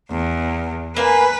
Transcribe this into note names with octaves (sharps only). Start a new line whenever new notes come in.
E2
A#3 B4 F5 G#5